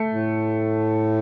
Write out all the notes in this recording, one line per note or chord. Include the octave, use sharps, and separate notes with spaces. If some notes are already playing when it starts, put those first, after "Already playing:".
Already playing: A3
A2